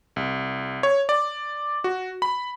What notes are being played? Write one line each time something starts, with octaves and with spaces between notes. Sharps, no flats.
C2
C#5
D5
F#4
B5